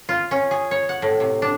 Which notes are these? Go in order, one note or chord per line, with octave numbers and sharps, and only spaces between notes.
F4
C#4
G#4
C#5
F#5
A2
C3
D4